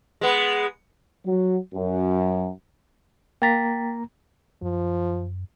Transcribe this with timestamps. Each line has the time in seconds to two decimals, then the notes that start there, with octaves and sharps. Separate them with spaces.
0.21 G#3 B3
1.26 F#3
1.74 F#2
3.42 A#3 G5 A#5 A6 B6
4.62 F#2 F3